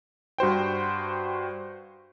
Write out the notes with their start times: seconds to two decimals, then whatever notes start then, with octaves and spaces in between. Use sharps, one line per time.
0.38 G2 F#4 C5 G5